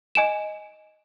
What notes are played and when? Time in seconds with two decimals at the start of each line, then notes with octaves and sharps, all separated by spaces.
0.15 D#5 G#5 D7 E7